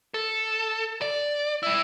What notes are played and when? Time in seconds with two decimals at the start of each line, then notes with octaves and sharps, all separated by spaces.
0.14 A4
1.01 D5
1.63 G3 E4